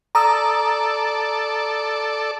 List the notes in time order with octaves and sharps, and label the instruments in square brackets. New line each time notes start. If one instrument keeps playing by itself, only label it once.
[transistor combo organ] A4 D5 [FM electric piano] A#5 D#6 E6